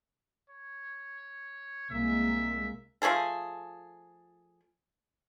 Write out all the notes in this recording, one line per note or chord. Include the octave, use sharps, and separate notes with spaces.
C#5
C2 G#3 A#3 E5
F3 A3 G#4 A4